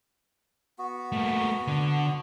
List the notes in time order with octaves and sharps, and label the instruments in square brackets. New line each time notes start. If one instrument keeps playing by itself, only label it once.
[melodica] B3 F#4
[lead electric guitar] A3 A#3
D3